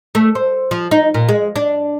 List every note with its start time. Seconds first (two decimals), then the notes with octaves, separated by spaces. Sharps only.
0.15 A3
0.35 C5
0.71 F3
0.91 D#4
1.14 A#2
1.29 G#3
1.56 D4